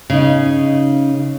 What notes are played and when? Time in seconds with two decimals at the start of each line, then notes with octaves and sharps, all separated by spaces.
0.10 C#3 D#4